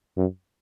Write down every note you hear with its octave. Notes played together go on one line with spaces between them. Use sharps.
F#2